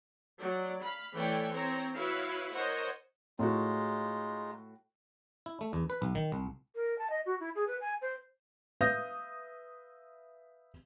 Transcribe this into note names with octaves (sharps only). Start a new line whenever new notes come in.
F#3 D5
F5 B5
E3 A3 A4 C#5 D5 G5
C4 C5 C#5 A#5
E4 F#4 B4 C#5 E5 F5
A#4 C5 C#5 D#5 F#5
A2 G#3 D#4 F4 F#4
E4
A3
E2
B4
B1
D#3
C2
A#4
A5
D#5
F#4
E4
G#4
B4
G#5
C5
B4 E5 F5 D#6 G6 A#6